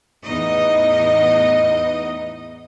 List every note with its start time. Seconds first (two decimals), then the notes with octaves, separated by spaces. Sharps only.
0.24 E2 A2 B3 D#4 D#5